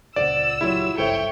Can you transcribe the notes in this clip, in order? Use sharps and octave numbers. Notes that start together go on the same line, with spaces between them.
D#1 C#2 F4 C5 D5 F#5 E6
F#3 E4 F4 G4
G#1 C#2 G2 A4 C5 C#5 E5 G5